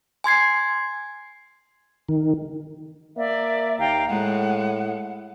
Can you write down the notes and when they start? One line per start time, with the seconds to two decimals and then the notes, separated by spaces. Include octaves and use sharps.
0.24 G#5 C6 G#6 C7
2.09 D#3
3.17 A#3 D5 E5
3.78 D#2 F5 G5 A#5
4.09 A2 G#3 F#5